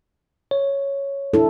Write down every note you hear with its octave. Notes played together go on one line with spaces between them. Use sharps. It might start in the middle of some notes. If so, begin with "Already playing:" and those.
C#5
D4 E4 A4